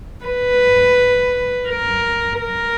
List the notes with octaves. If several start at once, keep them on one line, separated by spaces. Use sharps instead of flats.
B4
A#4
A#4